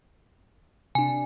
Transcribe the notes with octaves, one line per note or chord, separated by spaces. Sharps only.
C3 D4 G#5